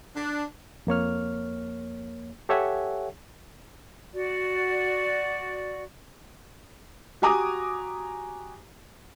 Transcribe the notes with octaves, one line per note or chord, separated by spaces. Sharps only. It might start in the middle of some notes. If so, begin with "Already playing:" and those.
D4
F2 A#3 C#5 F6
G4 A4 C#5 E5 F#5 G#5
F#4 D5
F#4 G4 G#5 A#5 D6 D#6